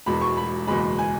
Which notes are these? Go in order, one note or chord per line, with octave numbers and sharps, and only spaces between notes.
E1 E2 B2 G#3 B5
C#6
B5
F#1 E2 B2 G#3 B5
G#5